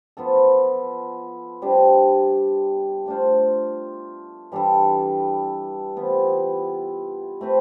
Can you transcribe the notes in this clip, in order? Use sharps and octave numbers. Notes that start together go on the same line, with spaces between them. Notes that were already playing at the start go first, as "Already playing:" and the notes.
F3 B3 F4 A4
C3 G3 D4
A3 D4 F4 C5
E3 G3 D4 A4
C3 E3 B3 F4
A3 C4 G4 B4